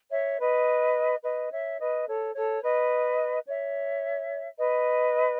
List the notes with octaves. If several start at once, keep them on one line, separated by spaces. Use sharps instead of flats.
C#5 E5
B4 D#5
B4 D#5
C#5 E5
B4 D#5
A4 C#5
A4 C#5
B4 D#5
C#5 E5
B4 D#5